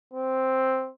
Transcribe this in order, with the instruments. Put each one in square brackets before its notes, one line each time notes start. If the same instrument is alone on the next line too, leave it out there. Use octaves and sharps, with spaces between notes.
[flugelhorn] C4